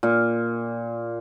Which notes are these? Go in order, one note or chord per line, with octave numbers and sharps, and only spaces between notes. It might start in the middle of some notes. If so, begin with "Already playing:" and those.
A#2